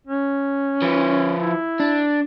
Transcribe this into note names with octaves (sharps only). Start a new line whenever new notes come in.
C#4
F3 B4
E4
D4